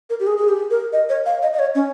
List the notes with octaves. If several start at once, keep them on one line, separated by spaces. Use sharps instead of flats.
A#4
G4
G#4
G#4
G4
A#4
D#5
C#5
F5
D#5
D#5
C#5
C#4